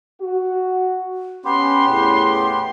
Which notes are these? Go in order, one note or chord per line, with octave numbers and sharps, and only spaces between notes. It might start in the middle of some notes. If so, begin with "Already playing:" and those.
F#4
B3 C#4 G4 C6
E2 A2